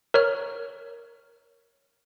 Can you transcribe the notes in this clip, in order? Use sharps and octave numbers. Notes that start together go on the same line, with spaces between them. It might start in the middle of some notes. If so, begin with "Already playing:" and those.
A#4 C#5 F6